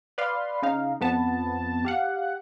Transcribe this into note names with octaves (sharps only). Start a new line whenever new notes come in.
B4 D5 F5 C6
C#3 D#4 F5
F2 B3 A5
G4 F5 F#5